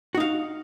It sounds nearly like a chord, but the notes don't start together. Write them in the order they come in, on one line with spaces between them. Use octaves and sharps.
F#4 D#4 F5